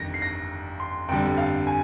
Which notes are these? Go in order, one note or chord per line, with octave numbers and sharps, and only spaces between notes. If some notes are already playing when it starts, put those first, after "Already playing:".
Already playing: G1 F2 C3 D#3 A#6
C7
A#6
C6
G1 F2 D3 G3 G5
F5
G#5